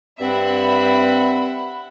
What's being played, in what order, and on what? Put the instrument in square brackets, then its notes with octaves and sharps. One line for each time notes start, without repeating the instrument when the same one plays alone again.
[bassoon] G2 [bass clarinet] C4 [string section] E5 F#5 B5